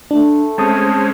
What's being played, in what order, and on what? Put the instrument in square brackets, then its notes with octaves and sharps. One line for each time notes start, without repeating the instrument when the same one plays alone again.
[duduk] A3 [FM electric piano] D4
[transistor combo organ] G#3 C4 C#4 [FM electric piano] A5 D#6